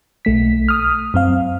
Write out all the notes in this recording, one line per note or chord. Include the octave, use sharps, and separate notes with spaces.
B1 A3 B6
D#6 F6
F#2 C4 F5